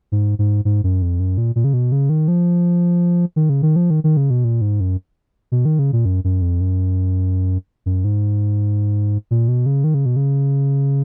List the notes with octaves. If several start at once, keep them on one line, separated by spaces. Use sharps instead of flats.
G#2
G#2
G#2
F#2
F2
F#2
A#2
A#2
C#3
B2
C#3
D#3
F3
D#3
C#3
D#3
F3
D#3
D#3
C#3
B2
A#2
G#2
F#2
B2
D#3
C#3
A#2
F#2
F#2
F2
F#2
F#2
G#2
A#2
B2
C#3
D#3
C#3
B2
C#3